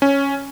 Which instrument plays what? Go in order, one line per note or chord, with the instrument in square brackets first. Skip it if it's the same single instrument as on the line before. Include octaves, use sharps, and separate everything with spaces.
[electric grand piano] C#4